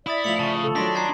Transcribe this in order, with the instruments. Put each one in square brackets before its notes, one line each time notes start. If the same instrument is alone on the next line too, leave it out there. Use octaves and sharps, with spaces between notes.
[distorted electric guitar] E4 [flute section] D5 E5 [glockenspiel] B5 D#6 A6
[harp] A2 F3 [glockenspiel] C#7 F7 F#7
[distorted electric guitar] C#3 [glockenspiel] A5 C#6
[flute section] A4
[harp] D#3 F#3 [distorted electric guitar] D4 [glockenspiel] C6 A#6 B6
[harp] G5 A#5 C6 [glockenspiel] A5 G#6 C7